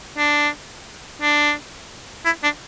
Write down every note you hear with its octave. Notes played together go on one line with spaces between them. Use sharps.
D4
D4
E4
D4